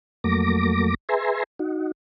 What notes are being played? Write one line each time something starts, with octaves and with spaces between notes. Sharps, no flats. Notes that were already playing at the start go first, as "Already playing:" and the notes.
F2 F#3 A3 A#3 D6 A#6
G#4 B4 E5 G#5 A#5 C6
D#4 F#4